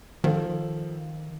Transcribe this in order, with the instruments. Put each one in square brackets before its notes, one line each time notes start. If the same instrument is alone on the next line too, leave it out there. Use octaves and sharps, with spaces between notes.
[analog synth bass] D#3 [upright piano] F3 A4